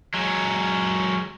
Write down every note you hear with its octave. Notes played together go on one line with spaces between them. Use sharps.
F#3 G#3